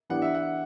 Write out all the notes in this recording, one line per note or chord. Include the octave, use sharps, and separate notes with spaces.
E3 B3 D4 G4 F#5
E5
F#5